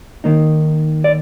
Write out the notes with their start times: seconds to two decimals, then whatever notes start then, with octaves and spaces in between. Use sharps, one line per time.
0.24 D#3 A#3 D#4
1.04 D5